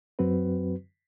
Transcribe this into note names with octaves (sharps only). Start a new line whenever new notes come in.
F#2 F#3 C4 F#4 B4